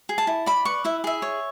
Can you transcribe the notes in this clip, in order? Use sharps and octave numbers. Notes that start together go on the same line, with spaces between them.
G#4
A5
E4
D5 B5
B4 C#6
E4 E5
G#4 E5
C#5